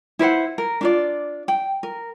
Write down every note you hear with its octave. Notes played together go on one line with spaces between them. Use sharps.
E4 B4 C5 F#5
A#4
D4 F4 D5
G5
A#4